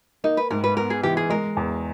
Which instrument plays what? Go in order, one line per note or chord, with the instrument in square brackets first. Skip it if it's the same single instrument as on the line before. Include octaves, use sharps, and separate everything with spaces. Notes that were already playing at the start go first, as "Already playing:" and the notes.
[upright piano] A#3 [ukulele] D#4
[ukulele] B4
[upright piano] G#2 [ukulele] A#4
[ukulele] B4
[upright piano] B3 [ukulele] A#4
[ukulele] G#4
[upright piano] E3 [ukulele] G4
[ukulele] G#4
[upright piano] G#3 [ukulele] A#4
[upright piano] E2